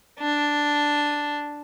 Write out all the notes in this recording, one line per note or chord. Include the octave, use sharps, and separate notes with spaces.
D4